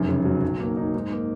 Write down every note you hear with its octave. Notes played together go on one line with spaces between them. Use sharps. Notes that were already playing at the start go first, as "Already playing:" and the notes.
Already playing: F1 F#2
C#3
F#3
B1
A#3
D#4
G#2
A#3